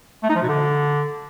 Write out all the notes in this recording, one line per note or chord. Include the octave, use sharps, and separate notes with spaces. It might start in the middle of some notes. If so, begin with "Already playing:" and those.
A3
D#4
F3
B2
D3